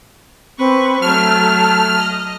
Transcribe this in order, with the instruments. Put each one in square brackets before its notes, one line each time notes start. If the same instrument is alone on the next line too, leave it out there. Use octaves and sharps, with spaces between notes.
[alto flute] C4 [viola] B4 C#6
[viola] F#3 A3 [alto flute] A5 [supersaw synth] F6
[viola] D#5